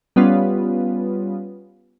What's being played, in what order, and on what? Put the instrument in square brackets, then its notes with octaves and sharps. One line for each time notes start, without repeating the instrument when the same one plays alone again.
[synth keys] G3 B3 C#4 F4